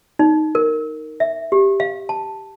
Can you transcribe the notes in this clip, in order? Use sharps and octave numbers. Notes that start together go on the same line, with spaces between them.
D#4
A#4
E5
G4
F5
A5